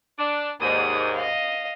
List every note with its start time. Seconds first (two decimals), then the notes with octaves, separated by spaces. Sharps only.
0.18 D4
0.60 D#2 G#2 D5 D#6
1.15 D#5 F5